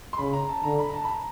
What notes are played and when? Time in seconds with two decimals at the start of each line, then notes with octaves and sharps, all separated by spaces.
0.13 C6
0.18 C#3 B5
0.33 A#5
0.49 A5
0.63 D3 A#5
0.79 B5
0.90 A#5
0.94 A5
1.04 B5
1.10 A#5